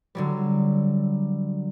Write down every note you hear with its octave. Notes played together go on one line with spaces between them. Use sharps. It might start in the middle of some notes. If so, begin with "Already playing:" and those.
D3 F#3 G3